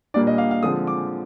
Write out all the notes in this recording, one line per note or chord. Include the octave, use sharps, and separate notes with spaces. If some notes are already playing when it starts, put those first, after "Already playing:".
A#2 G3 A#3 D4 D5
D#5
F5
F5
D3 F3 G#3 C4 D#6
D6